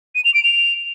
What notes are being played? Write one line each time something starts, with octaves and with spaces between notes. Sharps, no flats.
D#7
F7
D7
F7